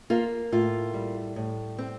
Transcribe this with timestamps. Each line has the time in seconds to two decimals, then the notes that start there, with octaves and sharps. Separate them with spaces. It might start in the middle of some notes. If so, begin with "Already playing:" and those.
0.10 A#3 F4
0.52 A2 F4
0.94 G3
1.36 A2
1.78 C4